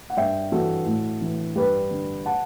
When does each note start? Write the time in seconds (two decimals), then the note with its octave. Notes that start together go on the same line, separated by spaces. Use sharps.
0.10 F#5
0.17 G2 E5 G5
0.52 E3 F#4 A4
0.86 A2
1.22 E3
1.56 G2 G4 B4
1.91 D3
2.26 F#5 A5